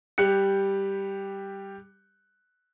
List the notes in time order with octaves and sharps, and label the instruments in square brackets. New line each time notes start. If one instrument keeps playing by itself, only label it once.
[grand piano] G3 G4 F#6 C#7